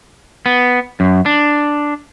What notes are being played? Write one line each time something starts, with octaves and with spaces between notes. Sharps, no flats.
B3
F#2
D4